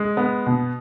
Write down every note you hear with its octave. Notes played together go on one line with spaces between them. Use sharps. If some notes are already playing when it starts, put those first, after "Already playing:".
Already playing: G#3
B3
B2